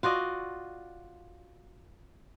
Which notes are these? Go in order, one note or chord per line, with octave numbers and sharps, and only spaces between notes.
F4 F#4 D5 D#5